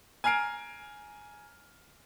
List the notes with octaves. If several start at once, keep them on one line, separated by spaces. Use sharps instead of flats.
G#5 A#5 F6 C7 D7